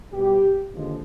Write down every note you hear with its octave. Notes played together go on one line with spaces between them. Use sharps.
B2 G3 B3 G4
D#2 D3 F3 G#3